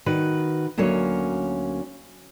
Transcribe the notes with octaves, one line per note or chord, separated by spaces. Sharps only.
D#3 F#4 B4
D2 F#3 A#3 C#4 C#5